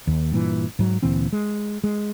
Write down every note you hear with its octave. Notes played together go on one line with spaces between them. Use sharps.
D#2
G2 A#2 E3
G#2 F#3
D2 A#2 E3 C4
G#3
G#3